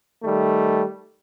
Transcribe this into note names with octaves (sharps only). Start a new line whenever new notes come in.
D#3 G3 A3